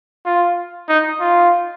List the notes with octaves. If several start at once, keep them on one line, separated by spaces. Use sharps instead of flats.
F4
D#4
F4